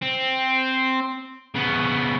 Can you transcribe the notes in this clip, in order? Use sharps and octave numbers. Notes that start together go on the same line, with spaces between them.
C4
C#3 B3